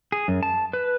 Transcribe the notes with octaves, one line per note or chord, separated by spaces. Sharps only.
G#4
F#2
A5
B4